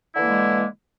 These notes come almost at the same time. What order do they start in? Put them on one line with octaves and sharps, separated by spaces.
E4 D3 E3 A#3 G#3